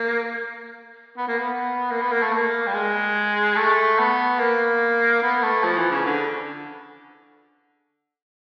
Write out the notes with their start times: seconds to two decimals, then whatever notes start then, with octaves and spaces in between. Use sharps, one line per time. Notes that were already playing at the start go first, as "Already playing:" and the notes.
Already playing: A#3
1.17 B3
1.28 A#3
1.38 B3
1.91 A#3
2.01 B3
2.12 A#3
2.22 A3
2.32 A#3
2.67 G3
2.74 G#3
3.56 A3
3.98 B3
4.40 A#3
5.22 B3
5.43 A3
5.64 F3
5.77 E3
5.91 C#3
6.05 D3